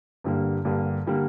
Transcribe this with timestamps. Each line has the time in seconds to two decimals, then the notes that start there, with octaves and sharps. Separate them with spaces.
0.24 G2 D3 G3 A#3
0.65 G2 D3 G3 A#3
1.07 D3 G3 A#3